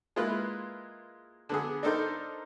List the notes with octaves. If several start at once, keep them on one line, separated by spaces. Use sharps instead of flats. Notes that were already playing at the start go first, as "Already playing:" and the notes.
G#3 A#3 E4 F4 B4
D3 B3 G#4
D4 D#4 A4 A#4 C5 D5